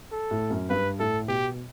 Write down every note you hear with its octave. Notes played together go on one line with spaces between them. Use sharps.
A4
A2
F#2
G2 B4
A2 A4
B2 G4